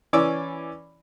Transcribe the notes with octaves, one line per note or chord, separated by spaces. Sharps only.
E3 C#4 D5 D6 E6